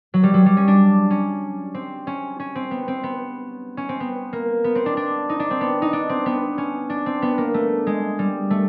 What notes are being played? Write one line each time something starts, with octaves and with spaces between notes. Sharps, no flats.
F#3
G3
F#3
G3
C#4
D4
C#4
C4
C#4
C#4
C4
B3
C4
B3
C#4
C4
B3
A#3
B3
C4
D4
D4
D#4
D4
C4
B3
D#4
D4
C4
B3
C#4
D4
C4
B3
A#3
A3
G#3
G3
A3